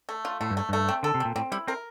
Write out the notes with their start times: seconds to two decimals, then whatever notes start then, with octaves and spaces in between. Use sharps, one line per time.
0.09 A3
0.25 F4
0.41 A2 A3
0.50 G2
0.57 A3
0.69 G2 A3
0.88 C4
1.03 D3 A4
1.14 C3
1.20 A#2 C4
1.36 A2 C4
1.52 G3 E4
1.67 C4 A#4